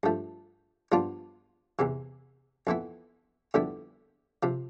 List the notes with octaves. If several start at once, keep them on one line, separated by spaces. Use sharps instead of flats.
G2 F3 A3
G2 F3 B3 D4 F4
E2 C3 E3
F2 E3 B3 E4
F2 D3 G3 B3 E4
C3 F3